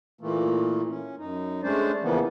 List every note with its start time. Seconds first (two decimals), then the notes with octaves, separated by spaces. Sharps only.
0.21 A#2 E3 A3 A#3
0.89 C#4
1.18 F#2 D#4
1.63 G#3 A3 C#4 D4 C5 D5
2.02 C#3 E3 F3 A#3 B3